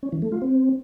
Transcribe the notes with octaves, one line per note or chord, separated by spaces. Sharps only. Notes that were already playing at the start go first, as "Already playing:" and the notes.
C#4
E3
A3
F4
C4